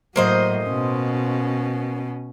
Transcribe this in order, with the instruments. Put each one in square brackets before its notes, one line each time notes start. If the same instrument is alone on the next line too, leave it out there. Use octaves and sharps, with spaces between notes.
[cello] A2 F#3 [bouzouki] A#3 C5 D#5
[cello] B2 C#4